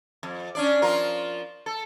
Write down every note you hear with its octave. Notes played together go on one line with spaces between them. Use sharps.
F2
C#4 D4 D5
F3 F4 A#4
A4